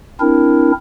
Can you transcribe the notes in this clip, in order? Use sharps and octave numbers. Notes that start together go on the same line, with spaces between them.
C4 D4 E4 A#4